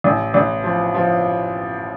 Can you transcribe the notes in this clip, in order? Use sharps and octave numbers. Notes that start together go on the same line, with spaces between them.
A1
A1
F3
F3